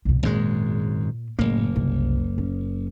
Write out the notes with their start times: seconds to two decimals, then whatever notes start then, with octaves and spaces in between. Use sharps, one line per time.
0.05 C2 B2
0.23 G#1 F#2 A#2 G#3
1.39 F#1 A2 A#3
1.76 C2
2.38 C#4